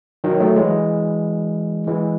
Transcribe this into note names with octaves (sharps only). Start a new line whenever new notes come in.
D#3 F#3
F#3 A3
E3 G#3
E3 G#3